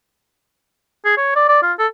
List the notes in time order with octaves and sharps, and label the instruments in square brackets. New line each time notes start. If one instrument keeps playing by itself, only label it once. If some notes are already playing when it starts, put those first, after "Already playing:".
[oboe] G#4
C#5
D5
D5
F4
A4